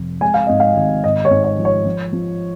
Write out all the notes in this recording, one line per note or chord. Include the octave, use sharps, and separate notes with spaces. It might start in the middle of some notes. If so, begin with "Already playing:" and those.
Already playing: F1
G#3 G#5
F5
G#2 D#5
F5
G#1
G#1 D#5
C#5
G#2
C#5
F3
C#5
F3
F3